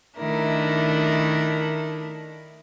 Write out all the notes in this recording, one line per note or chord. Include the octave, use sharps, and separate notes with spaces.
D#3 A3 D4 E4 A#4